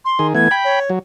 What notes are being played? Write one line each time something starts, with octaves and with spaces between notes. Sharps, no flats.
C6
D#3 G#4
E3 A3 B3 G#6
G5 B5
C#5
F#3